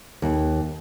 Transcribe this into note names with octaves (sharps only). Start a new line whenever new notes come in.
D#2